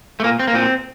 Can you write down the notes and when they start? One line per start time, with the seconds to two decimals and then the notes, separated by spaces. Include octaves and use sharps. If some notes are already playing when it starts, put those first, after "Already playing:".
0.20 A3
0.24 A#2 A#3
0.39 C4
0.47 A#3
0.54 A#2 C4